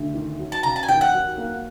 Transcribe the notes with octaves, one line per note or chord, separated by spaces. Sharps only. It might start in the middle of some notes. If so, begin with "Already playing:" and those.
Already playing: D2
D#3
F#3
A5
C#3 A#5
A5
G#5
D#2 G5
F#5
F#3
A#3